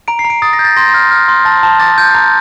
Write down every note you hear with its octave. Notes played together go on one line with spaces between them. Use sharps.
A#5 D7
C7
A#5
D7
D#6 A6
A#6
G6
A6
C6 A#6
F6
F6
C6
A5 A6
A5
D6 A6
G6
A#5 G6